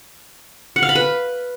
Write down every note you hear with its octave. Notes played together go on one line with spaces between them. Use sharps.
F#5
F5
B5
B4